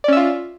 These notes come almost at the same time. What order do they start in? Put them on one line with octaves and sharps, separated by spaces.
D5 C#4 E5 F4